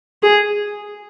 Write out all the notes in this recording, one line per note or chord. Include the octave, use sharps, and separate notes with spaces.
G#4